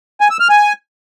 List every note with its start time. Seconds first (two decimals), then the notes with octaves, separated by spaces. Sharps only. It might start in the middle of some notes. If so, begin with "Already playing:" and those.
0.21 G#5
0.30 E6
0.40 F6
0.50 G#5